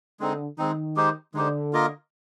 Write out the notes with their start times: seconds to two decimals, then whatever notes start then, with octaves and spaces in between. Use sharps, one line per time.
0.20 D3 G#3 C4 D#4
0.58 D#3 G#3 C4 D#4
0.96 G#3 D#4 G4 C5
1.34 D3 G#3 D#4 G4 C5
1.73 A#3 F4 A#4 D#5